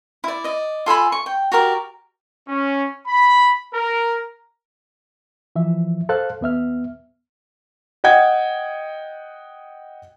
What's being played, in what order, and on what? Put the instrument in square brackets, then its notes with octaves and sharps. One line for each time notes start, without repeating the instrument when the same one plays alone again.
[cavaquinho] E4 D5
D5 D#5
F4 A4 G#5 B5
C#6
G5
F#4 G4 A#4 D5
[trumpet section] C#4
B5
A#4
[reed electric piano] E3 F3 E5
A4 C5 F5 A5 F#6
D#2 B3 E5 F6
[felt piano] D#5 F#5 G5 G#6